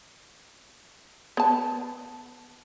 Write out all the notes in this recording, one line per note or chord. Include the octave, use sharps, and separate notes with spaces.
B3 A5